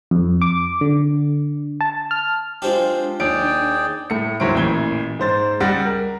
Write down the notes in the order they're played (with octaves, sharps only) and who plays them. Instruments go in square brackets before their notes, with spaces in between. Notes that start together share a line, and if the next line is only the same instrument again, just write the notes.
[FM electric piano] F2
D6
D3
A5
F6
[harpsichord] G#3 C4 A4 [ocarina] D4 [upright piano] F4 G4
[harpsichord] D#2 [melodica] G#4 D5 G5 [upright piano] D7
[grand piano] A2 C#7
D#2 F#3 E4 C5 C#6 D7
A1 A#2 E3 G#6 G7
G#2 C5 A6
C#2 G3 F#5 A6 A#6
A#4